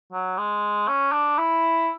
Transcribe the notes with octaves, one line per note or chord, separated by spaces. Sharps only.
F#3
G#3
C#4
D4
E4